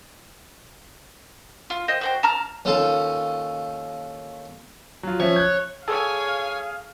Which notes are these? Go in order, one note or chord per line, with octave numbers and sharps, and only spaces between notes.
F4
C5 D#5 G5
F#4 C5 G5
A5 A#5 F6
D#2 C#4 D#4 F4 A4 F5
F#3 F4
F3 C#4 C#5 E5
F#6 G#6
G#4 A4 C#5 F5 G#5